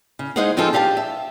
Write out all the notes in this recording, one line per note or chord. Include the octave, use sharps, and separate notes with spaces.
C#3
G#3 D#4 G#4 C5 F5 F#5
F3 C4 D#4 F4 G#4 A4
D4 G4 F5 G#5 A5
E5